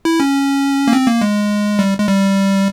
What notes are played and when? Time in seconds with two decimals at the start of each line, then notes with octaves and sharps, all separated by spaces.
0.05 E4
0.20 C#4
0.88 A#3
0.93 C4
1.07 A#3
1.21 G#3
1.79 G3
1.99 G#3
2.07 G3